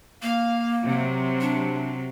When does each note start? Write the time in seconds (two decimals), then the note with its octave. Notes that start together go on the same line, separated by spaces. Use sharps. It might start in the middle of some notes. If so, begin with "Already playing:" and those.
0.22 A#3 F5
0.83 C3 F#3
1.41 D4